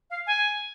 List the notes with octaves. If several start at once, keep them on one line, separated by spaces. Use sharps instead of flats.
F5
G#5